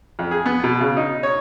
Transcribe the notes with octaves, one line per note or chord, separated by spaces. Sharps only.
F2
G#4
B3
B2
C#3
D#4
C#5